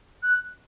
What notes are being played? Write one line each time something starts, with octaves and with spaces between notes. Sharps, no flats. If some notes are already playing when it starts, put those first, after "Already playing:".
F#6